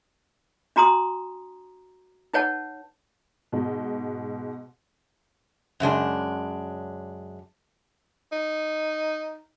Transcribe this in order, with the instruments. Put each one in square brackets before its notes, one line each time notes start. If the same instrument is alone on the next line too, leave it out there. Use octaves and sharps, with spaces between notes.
[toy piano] D4 F#4 A#5 C6 D#6
D#4 B4 C#5 F#5 A5
[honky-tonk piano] G#2 B2
[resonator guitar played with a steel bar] F#2 C#3 G#3 D4
[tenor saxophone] D#4